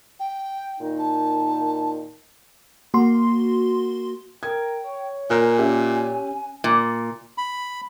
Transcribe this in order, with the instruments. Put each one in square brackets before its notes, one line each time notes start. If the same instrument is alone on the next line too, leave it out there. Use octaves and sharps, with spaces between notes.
[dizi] G5
[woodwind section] A#2 D#3 D#4
[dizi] A5
[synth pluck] A#3 [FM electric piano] F#4 C6
[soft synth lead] A#4 [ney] G5 [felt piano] G#6
[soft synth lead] C#5
[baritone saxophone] A#2 [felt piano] A#4 F#6 [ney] G#5
[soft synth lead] C#4 [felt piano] G4 E5
[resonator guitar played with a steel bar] A#2
[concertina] B5